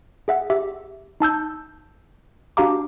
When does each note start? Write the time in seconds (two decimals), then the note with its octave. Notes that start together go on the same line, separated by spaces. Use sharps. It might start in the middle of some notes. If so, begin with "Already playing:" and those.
0.28 G#4 E5 F#5
0.50 G4 E5
1.20 D#4 A5 E6 G6
2.57 D4 F#4 G4 F5 A#5 D6